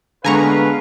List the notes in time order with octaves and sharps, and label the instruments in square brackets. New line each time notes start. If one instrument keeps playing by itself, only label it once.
[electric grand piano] D3 G#3 B3 [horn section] B4 F5 [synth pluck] G#5 A#5 C#6